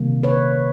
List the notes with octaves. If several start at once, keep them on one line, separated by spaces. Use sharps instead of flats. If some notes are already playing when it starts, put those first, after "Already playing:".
Already playing: C3 D#3 G3 A#3
B4 C#5